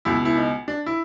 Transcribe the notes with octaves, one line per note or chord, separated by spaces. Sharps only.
C#2 B2 E4
E4
D#4
D4
E4